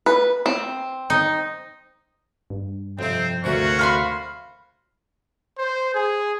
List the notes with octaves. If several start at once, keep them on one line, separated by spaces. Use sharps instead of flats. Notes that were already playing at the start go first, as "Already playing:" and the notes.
B4
C4
D#4
G2
F2 C3 C4 G5
D2 C3 C#4 F4 F#4 A#4
F5 B5 C6
C5
G#4